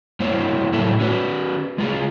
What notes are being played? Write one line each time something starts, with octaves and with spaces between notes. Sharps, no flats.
G3 A#3 E4 C5 C#5
A2 F#3 G3 E4 A4
C#4 F#4 B4
G#3 F4 G#4